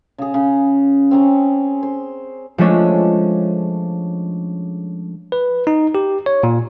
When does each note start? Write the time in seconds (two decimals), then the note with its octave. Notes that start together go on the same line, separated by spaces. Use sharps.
0.18 C#3 G#4
0.34 C#3
1.11 C4 C#4 A#5
1.83 C5
2.58 F3 G#3 A3 C#4 D4
5.32 B4
5.67 D#4
5.95 G4
6.26 C#5
6.43 A#2